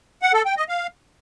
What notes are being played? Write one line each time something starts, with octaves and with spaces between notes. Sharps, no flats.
F#5
A4
G5
D#5
F5